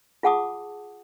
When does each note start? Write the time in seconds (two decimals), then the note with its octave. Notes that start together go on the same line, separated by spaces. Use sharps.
0.23 F4 G#4 F#5 A5 D6 D#6